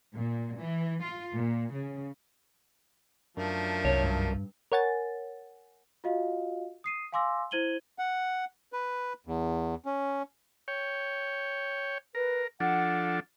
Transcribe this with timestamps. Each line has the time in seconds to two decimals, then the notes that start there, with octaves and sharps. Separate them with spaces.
0.14 A#2
0.57 E3
1.02 F4
1.35 A#2
1.74 C#3
3.37 F#2 F3 A3 D4 A#4
3.85 C2 C#5
4.03 G2
4.72 A#4 C#5 F#5 G#5 A6
6.04 F4 F#4 D#5 F5
6.84 D#6 C7 D#7
7.12 F5 G#5 C6 D6 E6 A#6
7.51 E4 C5 G#6 D#7 F#7 G7
7.99 F#5
8.73 B4
9.27 E2
9.85 C#4
10.68 C#5 G5
12.15 A#4 B4
12.60 F3 D4 A4 F#5